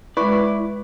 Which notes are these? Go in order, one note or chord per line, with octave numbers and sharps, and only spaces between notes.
G#3 E4 B4 D5 C#6